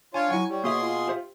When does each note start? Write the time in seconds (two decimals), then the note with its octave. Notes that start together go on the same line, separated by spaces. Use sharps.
0.14 D4 F4 C#5 G#5
0.31 F#3 E4 F#5 G#5 C#6
0.49 G3 C#5
0.64 B2 A#3 F#4 G#4 E5 C6
0.82 F4
1.08 G4 C5 E5